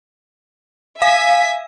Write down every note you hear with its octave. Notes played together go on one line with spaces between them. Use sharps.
E5 F5 G#5 B6